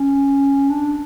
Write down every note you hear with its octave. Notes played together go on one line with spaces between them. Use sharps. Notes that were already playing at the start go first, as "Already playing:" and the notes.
Already playing: C#4
D4